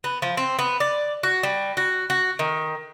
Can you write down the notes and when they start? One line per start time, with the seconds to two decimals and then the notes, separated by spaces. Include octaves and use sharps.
0.04 B3
0.22 F3
0.37 C4
0.59 B3
0.80 D5
1.23 F#4
1.43 G3
1.77 F#4
2.10 F#4
2.39 D#3